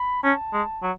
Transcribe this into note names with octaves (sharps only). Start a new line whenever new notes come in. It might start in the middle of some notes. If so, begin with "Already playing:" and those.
Already playing: B5
C#4 A5
G#3
F#3